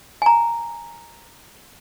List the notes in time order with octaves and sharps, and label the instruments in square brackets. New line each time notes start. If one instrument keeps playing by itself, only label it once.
[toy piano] G#5 A#5